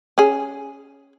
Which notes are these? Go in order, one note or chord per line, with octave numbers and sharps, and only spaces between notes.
C#4 G#4